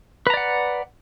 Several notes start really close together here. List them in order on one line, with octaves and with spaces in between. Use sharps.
B4 A#5 D5 F#5